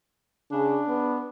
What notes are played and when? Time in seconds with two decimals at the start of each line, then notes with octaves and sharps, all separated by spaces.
0.51 C#3 D4
0.88 B3